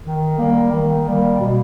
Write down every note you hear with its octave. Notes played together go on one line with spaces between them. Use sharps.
D#3
G3 A#3
D#3
G3 A#3
B2